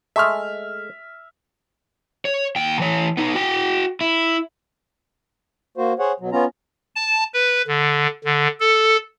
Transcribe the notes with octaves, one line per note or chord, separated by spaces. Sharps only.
G#3 A3 E5 F6
C#5
D#2 G5
E3 C#5
B3 D#4
F#4 G5
E4
A#3 F#4 C5
G#4 C5 C#5 F#5
B2 F#3
B3 C#4 F4 A#5
A5
B4
D3
D3
A4